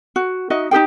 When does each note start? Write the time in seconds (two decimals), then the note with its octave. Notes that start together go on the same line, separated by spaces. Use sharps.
0.16 F#4
0.50 D#4 F#4 D#5 E5
0.71 D#4 G4 G#4 G5